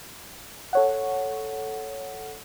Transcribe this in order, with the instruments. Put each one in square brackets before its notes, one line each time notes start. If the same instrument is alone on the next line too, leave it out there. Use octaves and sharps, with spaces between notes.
[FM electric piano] A4 C#5 F#5